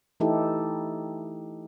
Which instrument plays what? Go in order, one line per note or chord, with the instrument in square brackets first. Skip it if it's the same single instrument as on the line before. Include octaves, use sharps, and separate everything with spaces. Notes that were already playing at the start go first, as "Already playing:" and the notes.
[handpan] E3 A3 D#4 E4 G4 A4